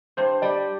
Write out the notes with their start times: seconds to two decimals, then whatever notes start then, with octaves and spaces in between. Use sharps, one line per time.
0.17 G2 C5
0.42 G3 D5